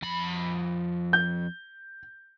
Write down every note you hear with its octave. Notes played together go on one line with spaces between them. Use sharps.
F2 B5
G6